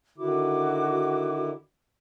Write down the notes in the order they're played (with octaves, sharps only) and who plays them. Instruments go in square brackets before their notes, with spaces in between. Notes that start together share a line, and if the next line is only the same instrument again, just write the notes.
[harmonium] D3 D#3 E4 [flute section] F#4 D6